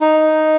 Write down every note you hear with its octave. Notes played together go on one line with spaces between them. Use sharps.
D#4